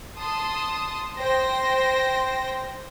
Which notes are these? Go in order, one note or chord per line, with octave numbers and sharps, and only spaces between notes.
A5 C6 D#6
C5 G5 A#6